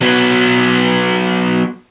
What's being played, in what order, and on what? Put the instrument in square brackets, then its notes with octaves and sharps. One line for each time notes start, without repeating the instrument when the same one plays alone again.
[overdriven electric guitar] F#3 B3